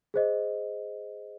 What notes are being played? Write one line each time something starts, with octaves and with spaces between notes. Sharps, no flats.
G#4 C5 D#5